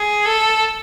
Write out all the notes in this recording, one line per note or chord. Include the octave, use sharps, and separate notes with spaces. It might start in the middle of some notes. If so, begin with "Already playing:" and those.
Already playing: G#4
A4